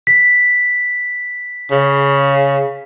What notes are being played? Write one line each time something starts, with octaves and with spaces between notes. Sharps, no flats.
B6
C#3